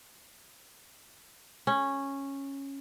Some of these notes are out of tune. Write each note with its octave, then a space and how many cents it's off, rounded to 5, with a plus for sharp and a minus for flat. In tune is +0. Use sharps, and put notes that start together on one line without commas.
C#4 -10